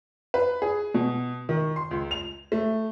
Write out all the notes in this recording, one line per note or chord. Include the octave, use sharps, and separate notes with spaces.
B4
G#4
B2
D#3
C6
C#2
F7
A3